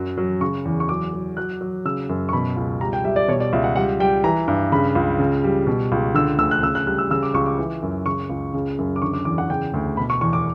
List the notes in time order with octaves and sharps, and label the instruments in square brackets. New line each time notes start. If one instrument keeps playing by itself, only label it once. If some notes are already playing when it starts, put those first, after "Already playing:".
Already playing: [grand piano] F#2 F#3
F#3
C#3 C#6
E2
C#6
F#3 D6
F#3
F#3 F#6
F#3
C#3 E6
F#2
C#6
B2 B5
C#2
G3 A#5
G5
G3 E5
D5
B2 C#5
D5
C#2 E5
F#5
G3 F#5
G3 G5
E3 A#5
G2
C#3 B5
C#2
C#3
G3
B2
C#2
D3 E6
D2 E6
F#6
C#3 E6
F#6
G3 F#6
E6
C#3 E6
D6
C#2 C#6
D6
E3
F#2
C#3 C#6
C#2
C#3
F#2
D6
D3 C#6
D6
E2 D6
F#5
C#3 G5
D2
B2 B5
C#6
E2 C#6
D6